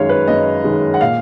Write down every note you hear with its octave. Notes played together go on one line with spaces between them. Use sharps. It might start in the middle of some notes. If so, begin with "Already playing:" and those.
Already playing: F#2 D#3 G#3 C#5 F5
B4
F#2 D#5
D#3 G#3
F#5
A#2 F5